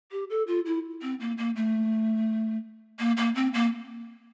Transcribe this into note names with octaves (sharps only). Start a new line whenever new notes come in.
G4
A4
F4
E4
C4
A#3
A#3
A3
A#3
A#3
C4
A#3